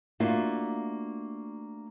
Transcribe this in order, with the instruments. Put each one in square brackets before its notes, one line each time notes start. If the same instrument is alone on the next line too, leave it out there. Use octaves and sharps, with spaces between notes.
[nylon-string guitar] A3 A#3 D4 F4 F#4 E5